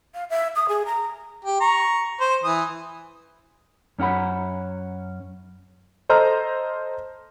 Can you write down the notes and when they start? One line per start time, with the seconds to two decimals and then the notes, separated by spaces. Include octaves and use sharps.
0.14 F5
0.30 E5
0.56 D#6
0.69 G#4
0.86 A#5
1.45 G4
1.61 A#5 C#6
2.20 C5
2.44 E3 D#6
3.99 F#2 C#4 E4 F#5 B5
6.09 A4 C5 D#5 A#5 F6